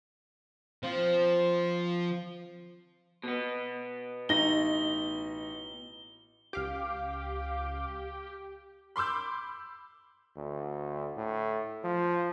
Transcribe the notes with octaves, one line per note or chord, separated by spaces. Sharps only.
F3 C4
B2 B3
A1 D#4 A#6 G7
C#2 G4 F5 D6
B5 C6 D6 E6 G6
D2
A2
F3